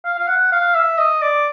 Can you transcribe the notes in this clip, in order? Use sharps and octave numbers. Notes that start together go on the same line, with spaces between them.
F5
F5
F#5
F5
E5
D#5
D5